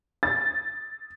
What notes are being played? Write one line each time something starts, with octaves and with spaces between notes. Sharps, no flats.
A6